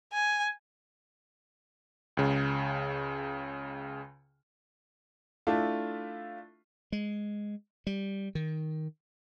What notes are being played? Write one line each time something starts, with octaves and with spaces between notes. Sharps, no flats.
G#5
C#2 C#3
A3 D4 E4 F4
G#3
G3
D#3